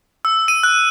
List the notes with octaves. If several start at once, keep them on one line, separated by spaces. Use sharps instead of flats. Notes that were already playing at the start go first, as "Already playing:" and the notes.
E6
D#7
F#6